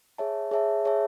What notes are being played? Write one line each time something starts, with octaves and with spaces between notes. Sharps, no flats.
G#4 C#5 E5 A5
G#4 C#5 E5 A5
G#4 C#5 E5 A5